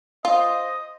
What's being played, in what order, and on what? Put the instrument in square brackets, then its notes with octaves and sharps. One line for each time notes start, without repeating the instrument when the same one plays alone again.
[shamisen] F4 [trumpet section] C5 D#5 D#6